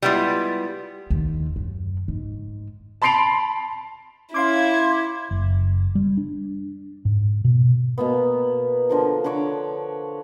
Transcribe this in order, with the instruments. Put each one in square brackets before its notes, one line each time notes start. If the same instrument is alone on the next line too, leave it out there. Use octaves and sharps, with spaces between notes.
[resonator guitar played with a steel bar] G3 G#3 B3 E4 F4
[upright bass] D#2
F#2
G#2
[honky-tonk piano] A5 B5 C6 C7 D7 F7
[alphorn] C#4 [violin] E4 [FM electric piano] F5 C6 D6 [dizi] G#6
[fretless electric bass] F#1
G3
D4
G#2
B2
[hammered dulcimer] B2 A#3 B3
D3 F3 A#4
D3 B4 C#5 D6